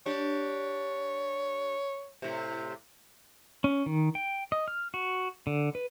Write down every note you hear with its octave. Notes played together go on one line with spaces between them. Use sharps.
D4 G4 C#5
A2 C3
C#4
D#3
G5
D#5
F6
F#4
D3
B4